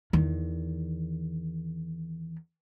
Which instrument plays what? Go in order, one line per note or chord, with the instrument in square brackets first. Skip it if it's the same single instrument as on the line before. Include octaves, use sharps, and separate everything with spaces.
[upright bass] E2 D#3